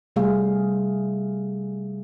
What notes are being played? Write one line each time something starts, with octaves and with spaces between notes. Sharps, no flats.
C3 G3 A3 G#4 F5